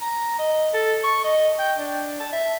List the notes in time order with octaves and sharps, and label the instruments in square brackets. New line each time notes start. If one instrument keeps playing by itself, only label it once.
[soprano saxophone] A#5
D#5
A4
C#6
D#5
G5
D4
A5
E5